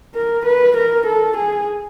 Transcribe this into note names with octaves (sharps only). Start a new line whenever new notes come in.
A#4
B4
A#4
A4
G#4